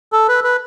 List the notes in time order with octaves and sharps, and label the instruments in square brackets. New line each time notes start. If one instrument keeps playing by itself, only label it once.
[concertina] A4
B4
B4